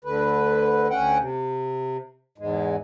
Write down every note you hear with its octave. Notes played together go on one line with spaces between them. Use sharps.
D2 D3 B4
D2 C#4 F#5 G5
C3
E2 G#2 G#3